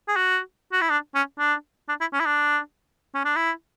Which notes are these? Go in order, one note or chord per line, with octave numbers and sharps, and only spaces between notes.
G#4
F#4
F#4
E4
D4
C#4
D4
D4
E4
C#4
E4
D4
C#4
D4
E4